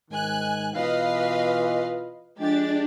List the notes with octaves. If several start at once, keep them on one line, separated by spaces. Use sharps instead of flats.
G#2 D#3 G#5 F#6
B2 E3 F4 B4 D#5 F5
F3 G#3 D4 G4 A6